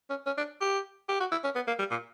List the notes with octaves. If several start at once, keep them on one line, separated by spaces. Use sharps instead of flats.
C#4
C#4
D4
G4
G4
F#4
E4
C#4
B3
A#3
G3
A#2